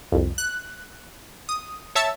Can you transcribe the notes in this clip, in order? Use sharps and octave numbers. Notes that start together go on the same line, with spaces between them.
C2 F2
F#6
D#6
C#5 E5 A5 E6 A6